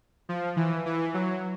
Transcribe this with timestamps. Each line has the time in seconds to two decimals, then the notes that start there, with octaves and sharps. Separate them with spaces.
0.29 F3
0.56 E3
0.86 E3
1.14 F#3